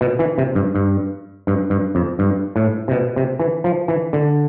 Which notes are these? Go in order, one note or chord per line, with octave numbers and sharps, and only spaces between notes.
B2
E3
C3
G2
G2
G2
G2
F2
G2
A2
C3
B2
C3
E3
F3
E3
D3